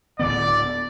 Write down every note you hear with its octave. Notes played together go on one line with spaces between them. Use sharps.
D1 D3 B3 D5